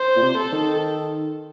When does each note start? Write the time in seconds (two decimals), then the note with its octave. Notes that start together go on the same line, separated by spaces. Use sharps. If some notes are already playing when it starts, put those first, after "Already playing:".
Already playing: C5
0.16 A#2
0.22 C3
0.38 A4
0.52 D#3